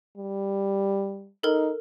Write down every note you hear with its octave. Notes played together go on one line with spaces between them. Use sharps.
G3
D#4 A4 A#4